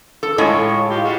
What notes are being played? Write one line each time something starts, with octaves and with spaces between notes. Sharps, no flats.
A4
A2 G#3 F4 C#5 D#5
F4 G4
G3 G#3 F#4